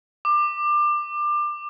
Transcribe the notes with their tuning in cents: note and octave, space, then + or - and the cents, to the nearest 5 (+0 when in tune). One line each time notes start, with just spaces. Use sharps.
D6 +25